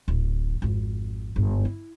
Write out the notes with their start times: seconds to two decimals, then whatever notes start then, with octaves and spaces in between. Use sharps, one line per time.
0.08 D1 A1
0.62 G#1 F2
1.36 G1 G#2
1.65 E4